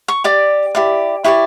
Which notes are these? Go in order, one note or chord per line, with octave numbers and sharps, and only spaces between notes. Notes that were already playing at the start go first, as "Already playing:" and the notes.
C#6
G4 D5 D6
E4 G4 D5
E4 G4 D5 C#6